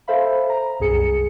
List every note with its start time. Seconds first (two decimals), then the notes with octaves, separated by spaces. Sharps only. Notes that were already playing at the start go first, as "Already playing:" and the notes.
0.08 A4 C5 E5 F5 B5
0.49 A#5
0.80 C2 F#2 G#4 C#7